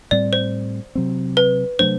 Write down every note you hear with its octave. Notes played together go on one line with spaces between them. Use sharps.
A2 G3 C4 D5
C5
C3 F#3 C4
B4
C3 F#3 A3 D4 C5